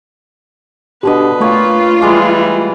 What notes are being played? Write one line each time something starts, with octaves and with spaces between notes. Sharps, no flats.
B2 D3 D4 G4 B4 D#5
A3 A#3 F4 C#5 G5
E3 G3 G#3 D6